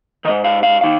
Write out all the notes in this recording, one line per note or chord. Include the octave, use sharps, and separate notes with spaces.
G#2 D#3 D#5
F5
F5
D#3 F5